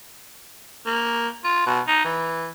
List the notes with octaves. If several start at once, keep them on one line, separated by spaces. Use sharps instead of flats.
A#3
F4
B2
D#4
E3